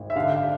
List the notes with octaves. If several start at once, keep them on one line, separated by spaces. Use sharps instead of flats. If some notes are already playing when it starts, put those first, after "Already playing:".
Already playing: G#1
E5
D3 F5
F5